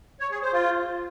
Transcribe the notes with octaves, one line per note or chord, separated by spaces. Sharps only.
C#5
G#4
C5
F4